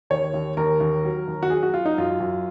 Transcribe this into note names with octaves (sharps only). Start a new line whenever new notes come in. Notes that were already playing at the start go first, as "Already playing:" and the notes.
D#2 C#5
D#2
D#2 A#4
D#2
F#3
D#2
F#4
F#3 G#4
F#4
F#3 F4
D#4
F#2 F4
F#2